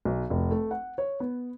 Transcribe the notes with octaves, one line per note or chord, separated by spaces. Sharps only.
B1
F1
A3
F#5
C#5
B3